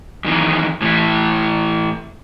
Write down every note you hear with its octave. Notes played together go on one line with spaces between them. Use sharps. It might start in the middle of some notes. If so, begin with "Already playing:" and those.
F#2 D#3 E3
A2 E3 E4